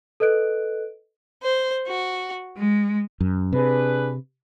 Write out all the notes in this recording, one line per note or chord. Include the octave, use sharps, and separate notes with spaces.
A4 B4 D#5 F#6 D7
C5
F#4
G#3
F#2
C3 D4 G#4 B4